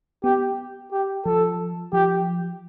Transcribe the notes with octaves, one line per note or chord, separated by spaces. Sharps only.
B3 G4
G4
F3 A4
F3 G4